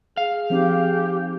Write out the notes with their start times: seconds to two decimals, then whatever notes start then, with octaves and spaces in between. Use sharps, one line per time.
0.17 G#4 F5
0.50 F3 C4 D#4 G4